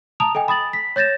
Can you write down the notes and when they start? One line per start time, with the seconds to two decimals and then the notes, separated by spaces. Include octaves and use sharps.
0.20 A5 A#5 D#6 F7
0.35 A4 D#5 G5 G#5
0.48 B5 D#6 A6 F#7
0.73 B6
0.96 C#5 G6 A6 A#6 E7